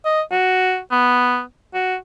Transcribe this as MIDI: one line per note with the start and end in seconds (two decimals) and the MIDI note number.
0.05 0.21 75
0.32 0.79 66
0.92 1.42 59
1.74 1.96 66